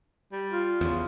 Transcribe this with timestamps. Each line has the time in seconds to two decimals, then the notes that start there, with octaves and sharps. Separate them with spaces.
0.32 G3
0.51 F4
0.81 E2 C#3